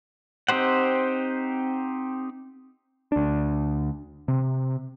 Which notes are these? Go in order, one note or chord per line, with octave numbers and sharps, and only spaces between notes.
C4 D#4 G4 C5 F#5
D2 D4
C3